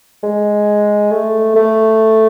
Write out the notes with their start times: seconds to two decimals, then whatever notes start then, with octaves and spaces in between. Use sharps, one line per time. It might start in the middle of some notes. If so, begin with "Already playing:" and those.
0.23 G#3
1.11 A3
1.56 A3